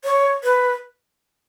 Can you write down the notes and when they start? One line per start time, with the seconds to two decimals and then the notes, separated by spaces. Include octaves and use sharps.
0.04 C#5
0.43 B4